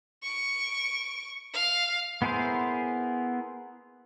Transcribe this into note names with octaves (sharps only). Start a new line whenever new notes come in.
C#6 D7
F5
B3 E4 G#4 A#4 C5